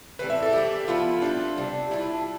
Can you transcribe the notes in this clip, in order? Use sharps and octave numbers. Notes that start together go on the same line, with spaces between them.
A2 E3 G3 C4 B4
E5
A4
E3 B3 D4 G4
F3 B3 E4 F4 B4
G3 C4 D4 E4
C3 G3 D4
G3 D4 E4 G4 B4